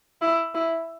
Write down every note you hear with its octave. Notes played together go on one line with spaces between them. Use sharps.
E4
E4